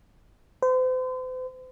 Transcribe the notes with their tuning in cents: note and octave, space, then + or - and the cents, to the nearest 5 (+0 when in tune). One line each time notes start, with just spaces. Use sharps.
C5 -40